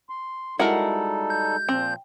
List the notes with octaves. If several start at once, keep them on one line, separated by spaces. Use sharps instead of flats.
C6
G3 G#3 D#4 E4 F#4 A4 A#4 F#5
G6
A#2 F3 C4